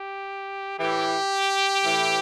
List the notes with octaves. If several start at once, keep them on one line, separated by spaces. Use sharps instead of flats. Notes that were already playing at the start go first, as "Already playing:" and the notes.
Already playing: G4
A2 E3 G4
A2 E3